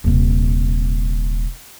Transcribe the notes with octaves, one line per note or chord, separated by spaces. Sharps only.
D#1 C3